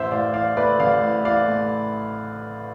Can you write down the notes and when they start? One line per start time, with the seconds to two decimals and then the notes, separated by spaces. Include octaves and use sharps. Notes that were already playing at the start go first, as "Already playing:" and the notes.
Already playing: A1 C5 E5
0.11 A2 D5 F5
0.34 E3 D5 F5
0.56 A3 B4 D5
0.79 A1 D5 F5
1.02 A2
1.25 E3 D5 F5
1.48 A3